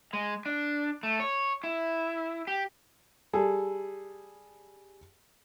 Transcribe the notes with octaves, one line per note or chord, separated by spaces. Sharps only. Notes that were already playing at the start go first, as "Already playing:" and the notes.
G#3
D4
A3
C#5
E4
G4
G3 G#4 A4